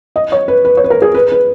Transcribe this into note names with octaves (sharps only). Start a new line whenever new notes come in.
D#5
C#5
B4
B4
C#5
B4
A#4
G#4
B4
B4